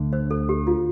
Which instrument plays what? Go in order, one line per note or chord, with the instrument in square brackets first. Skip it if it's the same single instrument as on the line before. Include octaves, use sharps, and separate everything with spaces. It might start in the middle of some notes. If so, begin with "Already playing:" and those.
Already playing: [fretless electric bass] D2 D3 A3
[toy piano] C5
A4
G4
F4